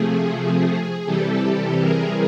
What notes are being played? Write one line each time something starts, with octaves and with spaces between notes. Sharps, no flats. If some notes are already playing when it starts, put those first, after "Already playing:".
Already playing: C3 F3 A3 G#4
C3 E3 G3 G4 A4
G#4 A#4